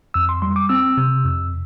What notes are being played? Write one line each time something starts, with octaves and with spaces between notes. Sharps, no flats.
F2 E6
C6
G3 C6
D6
C4 E6
C3
F2